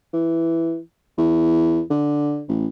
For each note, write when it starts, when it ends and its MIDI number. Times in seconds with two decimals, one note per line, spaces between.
0.13 0.78 52
1.18 1.81 40
1.90 2.43 50
2.48 2.67 33